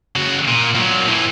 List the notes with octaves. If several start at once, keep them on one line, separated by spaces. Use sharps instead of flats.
C#3 F#4
A#2
A#2 F#3
A2 E3